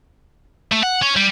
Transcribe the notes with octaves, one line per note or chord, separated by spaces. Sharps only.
A3
F#5
C#4
G3